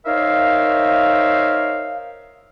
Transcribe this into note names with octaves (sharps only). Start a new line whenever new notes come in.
D#4 A#4 C5 C#5 E5 F5